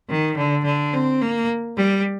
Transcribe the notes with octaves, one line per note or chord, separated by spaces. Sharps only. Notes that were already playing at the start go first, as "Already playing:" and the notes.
D#3
D3
D3
C4
A#3
G3